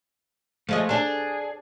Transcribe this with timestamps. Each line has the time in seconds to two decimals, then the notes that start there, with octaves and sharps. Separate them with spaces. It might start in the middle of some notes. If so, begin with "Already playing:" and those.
0.69 F3 G#3 A3 D#5
0.89 D4 G#4 A4